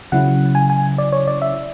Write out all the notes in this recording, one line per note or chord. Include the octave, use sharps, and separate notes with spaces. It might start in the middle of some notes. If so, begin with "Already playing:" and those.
C#3 F#3 C#4 E4 F#5
G#5
G#5
D5
C#5
D5
E5